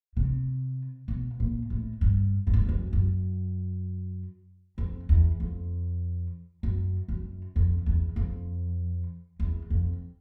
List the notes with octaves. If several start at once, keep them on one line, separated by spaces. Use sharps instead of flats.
C3
B2
A#2
A2
G2
G2
F#2
F2
F#2
F#2
F2
E2
F2
F#2
F#2
F2
E2
F2
E2
F2